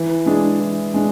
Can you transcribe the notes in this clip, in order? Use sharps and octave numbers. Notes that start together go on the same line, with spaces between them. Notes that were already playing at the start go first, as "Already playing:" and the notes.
Already playing: E3
G#3 D4 G#4
E3
G#3 D4